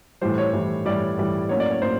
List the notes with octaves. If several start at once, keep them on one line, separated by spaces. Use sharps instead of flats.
A2 E3 G3 C5
C#5
A2 E3 G3
A2 E3 G3 D5
A2 E3 G3
A2 F#3 A#3 C#4 C#5
D5
C#5
A2 F#3 A#3 C#4 C5